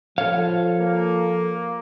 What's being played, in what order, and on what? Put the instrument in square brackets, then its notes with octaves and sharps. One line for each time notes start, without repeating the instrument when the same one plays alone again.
[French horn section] F3 [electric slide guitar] A4 C#5 [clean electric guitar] F5
[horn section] A#3